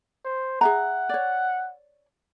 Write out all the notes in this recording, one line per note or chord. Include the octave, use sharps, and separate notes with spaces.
C5
G#4 E5 F#5 A#5
C#5 D5